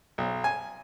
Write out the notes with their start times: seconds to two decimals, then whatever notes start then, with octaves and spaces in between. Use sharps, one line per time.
0.18 B1
0.44 G#5